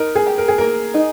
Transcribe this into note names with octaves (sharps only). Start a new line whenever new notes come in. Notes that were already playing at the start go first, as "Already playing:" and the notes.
Already playing: D#4 A#4
G#4
G4
A#4
G#4
A#3 A#4
D#4